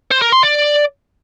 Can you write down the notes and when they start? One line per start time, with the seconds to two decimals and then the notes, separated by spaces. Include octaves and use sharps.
0.11 C5
0.22 A#4
0.32 C6
0.43 D5